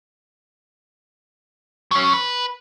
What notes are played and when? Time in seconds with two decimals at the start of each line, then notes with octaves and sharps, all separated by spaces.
1.91 F#3 C#4
2.14 B4